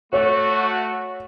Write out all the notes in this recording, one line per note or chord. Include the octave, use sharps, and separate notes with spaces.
A3 F#4 C#5